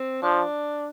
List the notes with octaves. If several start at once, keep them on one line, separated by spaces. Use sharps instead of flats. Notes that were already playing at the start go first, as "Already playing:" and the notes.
Already playing: C4
F3 D4